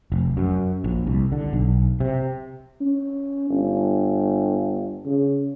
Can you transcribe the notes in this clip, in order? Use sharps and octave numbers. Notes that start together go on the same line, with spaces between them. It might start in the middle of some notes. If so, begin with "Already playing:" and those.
F1
F#2
A#1
C2
D3
B1
C3
C#4
G1
C#3